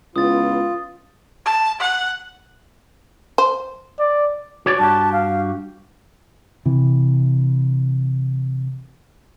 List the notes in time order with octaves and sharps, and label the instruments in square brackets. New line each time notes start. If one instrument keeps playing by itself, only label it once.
[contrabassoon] C#2 [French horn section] B3 E4 B4 [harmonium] F4 [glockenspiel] D#6 A6
[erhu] A5
F#5
[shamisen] C5
[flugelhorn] D5
[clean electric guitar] F#4 C#5 D5
[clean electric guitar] G2 F#4 G4 [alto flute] A5
[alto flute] F5
[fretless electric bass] C3 E3